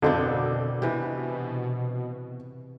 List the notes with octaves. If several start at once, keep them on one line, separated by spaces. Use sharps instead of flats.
F2 B2 D3 D#3 C4 D4
C3 E3